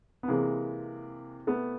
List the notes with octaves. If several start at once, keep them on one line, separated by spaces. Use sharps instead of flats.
B3
C3 E3 G#3 A#3
A3 B3